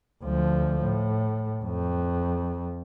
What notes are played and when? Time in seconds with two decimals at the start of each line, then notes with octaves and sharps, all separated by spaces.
0.23 D2 F3
0.83 A2
1.64 F2